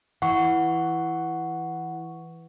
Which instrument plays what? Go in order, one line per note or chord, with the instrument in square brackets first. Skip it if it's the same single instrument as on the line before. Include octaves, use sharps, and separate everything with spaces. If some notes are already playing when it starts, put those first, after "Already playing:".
[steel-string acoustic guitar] E3 [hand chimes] F#5 C#6